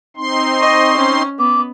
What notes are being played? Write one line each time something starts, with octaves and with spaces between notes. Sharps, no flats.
C4 D#4 C6
D#5 C#6
C#4
B3 D6